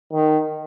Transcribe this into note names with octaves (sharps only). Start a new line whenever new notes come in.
D#3